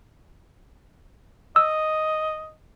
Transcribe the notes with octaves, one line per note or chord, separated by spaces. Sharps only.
D#5 E6